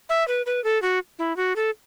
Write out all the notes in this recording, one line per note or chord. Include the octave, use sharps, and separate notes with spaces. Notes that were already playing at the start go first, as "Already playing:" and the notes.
E5
B4
B4
A4
F#4
E4
F#4
A4